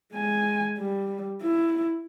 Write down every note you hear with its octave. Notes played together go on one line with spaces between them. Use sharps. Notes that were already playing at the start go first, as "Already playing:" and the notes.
G#3 G#5
G3
E4